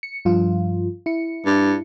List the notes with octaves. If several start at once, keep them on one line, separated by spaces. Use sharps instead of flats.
C#7
G2 F3 F4
E4 C#7
G2